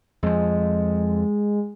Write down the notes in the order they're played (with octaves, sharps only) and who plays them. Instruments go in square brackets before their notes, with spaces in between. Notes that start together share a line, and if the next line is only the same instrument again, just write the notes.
[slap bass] F2 F3 [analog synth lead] G#3